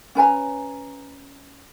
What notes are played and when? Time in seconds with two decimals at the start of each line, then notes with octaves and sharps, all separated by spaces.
0.15 C#4 B4 G#5 A#5